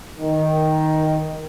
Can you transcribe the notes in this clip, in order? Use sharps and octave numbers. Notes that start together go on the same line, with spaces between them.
D#3